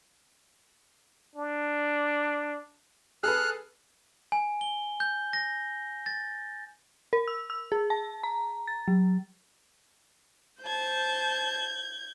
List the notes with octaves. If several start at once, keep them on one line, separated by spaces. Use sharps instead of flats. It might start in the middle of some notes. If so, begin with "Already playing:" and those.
D4
G#4 A4 B4 F6 F#6
G#5
G7
G6
A#6
A6
A#4
E6
E6
G#4
A5
A#5
A6
F#3
C5 A5 G6 G#6